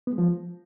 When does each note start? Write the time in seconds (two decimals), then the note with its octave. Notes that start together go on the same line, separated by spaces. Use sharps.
0.07 B3
0.13 G#3
0.18 F3